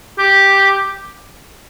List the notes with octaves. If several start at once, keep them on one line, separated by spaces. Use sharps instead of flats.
G4